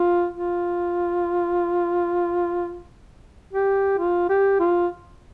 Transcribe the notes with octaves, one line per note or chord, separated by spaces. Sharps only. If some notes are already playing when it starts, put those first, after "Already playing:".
Already playing: F4
F4
G4
F4
G4
F4